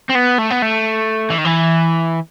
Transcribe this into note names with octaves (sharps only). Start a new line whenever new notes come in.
C4
B3
A3
B3
A3
E3
D#3
E3